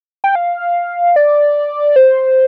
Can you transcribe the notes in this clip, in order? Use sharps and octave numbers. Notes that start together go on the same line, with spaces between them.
G5
F5
D5
C5